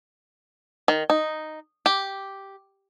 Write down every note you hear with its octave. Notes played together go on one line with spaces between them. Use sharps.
D#3
D#4
G4